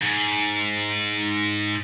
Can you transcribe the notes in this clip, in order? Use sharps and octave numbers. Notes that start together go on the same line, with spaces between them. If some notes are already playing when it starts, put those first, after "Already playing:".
G#2